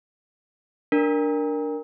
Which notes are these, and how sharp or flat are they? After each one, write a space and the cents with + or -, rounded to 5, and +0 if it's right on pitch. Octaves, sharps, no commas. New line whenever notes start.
D4 +0 A#4 +0